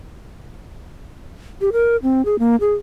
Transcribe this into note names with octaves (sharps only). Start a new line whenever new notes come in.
G4
A#4
C4
G#4
A#3
G#4